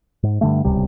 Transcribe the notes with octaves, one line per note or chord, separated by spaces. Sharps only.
G#2
G2 D3 A3
D1 C#2 C3 G3